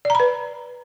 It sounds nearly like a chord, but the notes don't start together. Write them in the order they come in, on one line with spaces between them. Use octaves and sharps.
D5 A#5 B5 B4